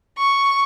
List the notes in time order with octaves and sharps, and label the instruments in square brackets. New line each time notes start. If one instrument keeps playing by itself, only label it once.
[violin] C#6